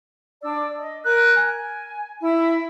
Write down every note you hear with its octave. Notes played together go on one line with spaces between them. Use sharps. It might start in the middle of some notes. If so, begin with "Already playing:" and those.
D4 D5 E6
D#5
A#4 F#6
G#5
E4 E6